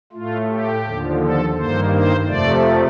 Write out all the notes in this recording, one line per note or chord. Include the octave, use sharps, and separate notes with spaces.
A2 A3 F4
G4
D#2 D3 F3
A4
G2 D#3 A#3 C5
C5
F2 C3 F3 A3 D5